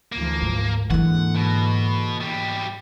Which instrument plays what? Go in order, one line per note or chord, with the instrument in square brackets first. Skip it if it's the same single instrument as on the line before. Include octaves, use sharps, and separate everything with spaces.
[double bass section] D2 E3 F3 [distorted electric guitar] A#3
[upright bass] G#2
[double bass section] G#2 D3 G#3 [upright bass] E3 A#3 [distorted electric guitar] F#5
[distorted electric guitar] B2
B2 G3